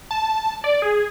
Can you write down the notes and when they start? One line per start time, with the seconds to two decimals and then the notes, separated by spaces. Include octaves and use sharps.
0.11 A5
0.64 D5
0.82 G#4